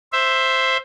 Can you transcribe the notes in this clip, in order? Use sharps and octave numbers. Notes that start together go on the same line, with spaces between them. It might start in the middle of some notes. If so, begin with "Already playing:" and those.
C5 E5